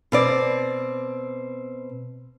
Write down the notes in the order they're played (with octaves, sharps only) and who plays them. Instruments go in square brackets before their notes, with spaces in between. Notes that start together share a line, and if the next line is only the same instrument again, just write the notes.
[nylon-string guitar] B2 C4 D5